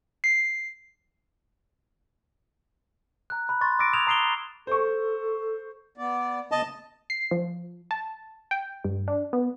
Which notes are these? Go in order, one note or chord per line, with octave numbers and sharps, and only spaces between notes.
C7
A#5 F#6
B5 F#6
C6 C#6 A6
D6 E6 A6 A#6 D7
D#6 F6 G#6 E7 F7
A#5 D#6 C7 D7 F7 G7
A4 C5 C#6
B3 D5
C#3 B3 D#5 A5
C7
F3
A5
G5
G2
D4
B3